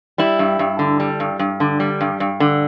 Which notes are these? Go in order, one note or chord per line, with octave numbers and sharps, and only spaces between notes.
G3 E4
G2
G2
D3
G3
G2
G2
D3
G3
G2
G2
D3